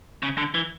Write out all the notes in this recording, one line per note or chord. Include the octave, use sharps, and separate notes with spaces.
C#3
D3
E3